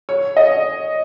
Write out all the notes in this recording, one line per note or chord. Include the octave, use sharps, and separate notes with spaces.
C#5
D#5